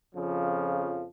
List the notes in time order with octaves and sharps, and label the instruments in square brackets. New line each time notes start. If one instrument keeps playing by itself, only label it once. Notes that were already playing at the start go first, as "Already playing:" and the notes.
[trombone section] F2 C#3 F3